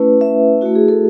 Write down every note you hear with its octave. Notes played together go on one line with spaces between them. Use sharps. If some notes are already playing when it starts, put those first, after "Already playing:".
Already playing: A3 C#4 E4 B4
E5
A3 E4 F#4
G#4
A4